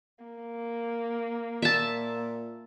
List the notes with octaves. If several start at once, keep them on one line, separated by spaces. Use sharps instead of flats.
A#3
A#2 E5 A5